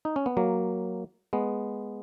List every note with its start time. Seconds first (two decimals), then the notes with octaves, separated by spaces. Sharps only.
0.05 D#4
0.16 C#4
0.26 B3
0.37 F#3 A#3
1.33 G#3 B3